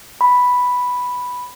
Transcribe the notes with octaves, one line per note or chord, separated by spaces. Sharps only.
B5